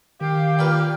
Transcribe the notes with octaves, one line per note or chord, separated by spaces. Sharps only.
D#3 G4 F5
A#2 B4 F6